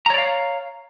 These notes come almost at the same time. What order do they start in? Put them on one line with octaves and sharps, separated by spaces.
A#5 C#5 D5 F5